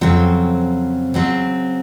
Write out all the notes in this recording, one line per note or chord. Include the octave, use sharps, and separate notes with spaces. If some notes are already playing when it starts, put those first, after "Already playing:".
F2 C#3 F#3 C4
C#3 F#3 C4